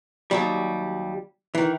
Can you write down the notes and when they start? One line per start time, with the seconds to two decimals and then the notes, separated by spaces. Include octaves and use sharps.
0.31 D#2 F#3 G3
1.55 D#3 E3